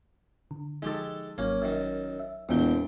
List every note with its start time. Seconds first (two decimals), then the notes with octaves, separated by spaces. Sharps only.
0.51 D3
0.82 F3 G#3 D#4 G4 A4
1.38 G#1 F#3 A#3 C#4
1.62 F#2 D#3
2.19 E5
2.49 E1 A#1 E2 B3 F4 G5